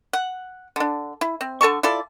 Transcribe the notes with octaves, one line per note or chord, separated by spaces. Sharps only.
F#5
D3 D4
E4
C4
D3 A4 A5 C#6
E4 F4 A4 D5